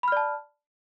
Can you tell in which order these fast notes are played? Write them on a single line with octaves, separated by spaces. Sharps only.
B5 F6 D5 A5